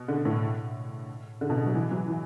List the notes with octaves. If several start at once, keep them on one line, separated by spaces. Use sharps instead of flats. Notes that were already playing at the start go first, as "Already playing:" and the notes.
Already playing: B2
D3
A2
D3
B2
D3
F#3
E3
F#3
E3